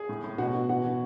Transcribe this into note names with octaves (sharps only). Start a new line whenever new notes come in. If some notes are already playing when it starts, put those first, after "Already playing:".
Already playing: G#4 G#5
A2
A2
B2 F#4 F#5
B2
E3 F#4 F#5
E3